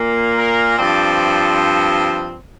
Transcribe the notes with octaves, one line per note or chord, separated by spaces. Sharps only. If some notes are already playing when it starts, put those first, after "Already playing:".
Already playing: A#2 A#3
A#4
G2 F3 C4 D5